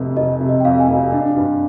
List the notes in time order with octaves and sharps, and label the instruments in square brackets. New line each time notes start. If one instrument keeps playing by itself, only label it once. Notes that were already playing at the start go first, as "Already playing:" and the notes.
Already playing: [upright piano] F1 F2 C3
[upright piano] F1 [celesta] D#5
[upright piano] C3
[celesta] D#5
G5
[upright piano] F2 [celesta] F5
[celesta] G#5
[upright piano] F1
D4
G2